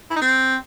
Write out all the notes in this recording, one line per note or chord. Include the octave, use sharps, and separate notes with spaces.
E4
D#4
C4